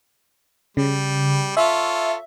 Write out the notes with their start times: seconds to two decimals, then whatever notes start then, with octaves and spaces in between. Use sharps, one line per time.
0.77 C#3 G3
1.57 F4 A4 C#5 E5